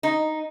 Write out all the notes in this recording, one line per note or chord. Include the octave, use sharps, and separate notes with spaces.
D#4